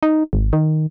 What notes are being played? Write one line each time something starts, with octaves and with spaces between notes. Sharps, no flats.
D#4
G#1
D#3